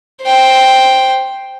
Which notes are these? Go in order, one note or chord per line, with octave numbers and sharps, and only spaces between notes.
C5 G5